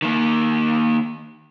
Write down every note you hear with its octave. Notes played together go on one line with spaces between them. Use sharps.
D#3 A#3